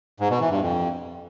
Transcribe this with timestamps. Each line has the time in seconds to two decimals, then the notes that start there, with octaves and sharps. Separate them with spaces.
0.20 G#2
0.30 B2
0.40 E3
0.50 G2
0.61 F2